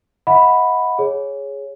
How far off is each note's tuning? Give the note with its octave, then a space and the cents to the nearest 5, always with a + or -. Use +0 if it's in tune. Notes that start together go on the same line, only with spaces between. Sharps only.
D#5 +35 F#5 -20 B5 +0
G#4 +0 C#5 +0